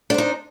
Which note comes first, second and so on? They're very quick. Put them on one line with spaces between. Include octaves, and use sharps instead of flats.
D4 C5 D#4